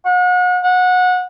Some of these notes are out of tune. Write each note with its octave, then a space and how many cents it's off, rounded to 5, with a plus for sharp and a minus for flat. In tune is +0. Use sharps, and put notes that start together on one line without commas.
F#5 -40
F#5 -25